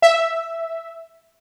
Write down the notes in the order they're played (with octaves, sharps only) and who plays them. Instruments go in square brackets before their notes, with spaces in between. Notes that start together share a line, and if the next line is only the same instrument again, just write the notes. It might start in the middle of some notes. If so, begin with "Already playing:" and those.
[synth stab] E5